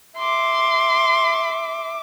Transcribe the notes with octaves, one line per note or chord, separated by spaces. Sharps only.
E5 C6 D6